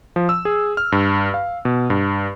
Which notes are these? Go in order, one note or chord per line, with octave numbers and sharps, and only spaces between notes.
F3
E6
G#4
F6
G2
F5
B2
G2